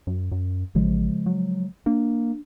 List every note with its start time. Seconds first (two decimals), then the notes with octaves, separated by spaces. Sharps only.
0.07 F#2
0.32 F#2
0.75 A1 C#3 F3 G#3
1.26 F#3
1.86 A#3 D4